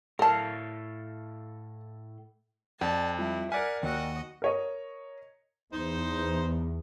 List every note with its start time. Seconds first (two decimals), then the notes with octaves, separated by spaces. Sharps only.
0.19 A2 A4 A#4 F5 A5
2.81 F2 D5 G5 A5
3.19 G3 C4 E4 F4
3.52 A#4 D5 F#5 G#5 F6 G#6 B6
3.83 D#2 F#4 D#5 F#5 G5 E6
4.42 A#4 C#5 D#5
5.73 E2 D#4 C5